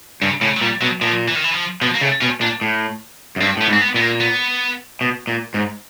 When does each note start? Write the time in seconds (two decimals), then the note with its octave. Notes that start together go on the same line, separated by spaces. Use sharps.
0.22 G2 C#3
0.41 A2 C#3
0.57 F#3
0.61 A#2 G3
0.81 B2 F#3
1.01 A#2 F3
1.28 E3
1.36 D#3
1.44 E3
1.55 F3
1.81 B2 F3
1.95 A#3
2.01 C#3 A3
2.21 B2 C#4
2.41 A#2 D4
2.61 A2
3.36 F#2
3.41 G2 C4
3.57 A2 B3
3.68 G#2
3.73 C4
3.81 B3
3.94 A#2 B3
4.01 A#3
4.20 B3
5.01 B2
5.27 A#2
5.54 G#2